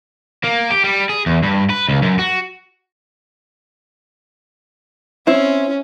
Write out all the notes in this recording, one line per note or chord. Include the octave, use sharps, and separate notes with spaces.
A#3
G4
G3
G#4
E2
G2
B4
C#2
F#2
F#4
C4 C#4 E4